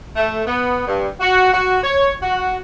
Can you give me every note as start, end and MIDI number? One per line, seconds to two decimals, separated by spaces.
0.16 0.42 57
0.46 0.82 59
0.87 1.08 43
1.20 1.51 66
1.52 1.78 66
1.84 2.12 73
2.22 2.57 66